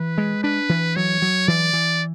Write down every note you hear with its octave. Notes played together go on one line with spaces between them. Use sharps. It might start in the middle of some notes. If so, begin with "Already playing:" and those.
Already playing: E3 B4
G#3
D4 B4
E3
F#3 C#5
F#3
E3 D5
E3